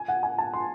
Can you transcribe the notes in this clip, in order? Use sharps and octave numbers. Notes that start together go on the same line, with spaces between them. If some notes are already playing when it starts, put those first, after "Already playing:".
Already playing: G#5
F#5
G#5
A5
C6